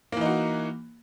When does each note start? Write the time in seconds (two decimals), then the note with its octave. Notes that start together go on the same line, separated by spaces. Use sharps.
0.12 A#3
0.17 E3
0.21 D#4
0.25 F#4